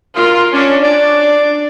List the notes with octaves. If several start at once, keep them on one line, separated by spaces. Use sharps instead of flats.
F4 A#4
C#4 D4 D5
D4 D5